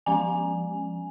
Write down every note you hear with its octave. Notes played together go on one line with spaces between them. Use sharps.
F3 G#3 C#4 G#5